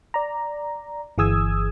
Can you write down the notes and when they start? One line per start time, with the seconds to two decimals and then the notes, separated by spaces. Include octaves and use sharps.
0.14 D5 A#5
1.18 G1 E3 G#4 D#6 E6 G#6